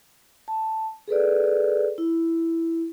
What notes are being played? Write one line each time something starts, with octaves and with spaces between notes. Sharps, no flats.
A5
G#4 A4 B4 D5
E4